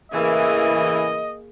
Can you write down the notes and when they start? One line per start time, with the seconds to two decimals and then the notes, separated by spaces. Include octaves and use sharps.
0.12 A2 C#3 E3 A#3 G#4 D#5